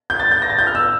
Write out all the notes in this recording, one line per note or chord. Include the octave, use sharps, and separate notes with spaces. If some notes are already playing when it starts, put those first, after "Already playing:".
G6
A6
G6
A#6
A6
G6
F6
E6